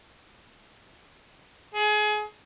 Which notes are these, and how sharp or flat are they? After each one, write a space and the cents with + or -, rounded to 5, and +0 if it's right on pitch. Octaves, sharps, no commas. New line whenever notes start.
G#4 +30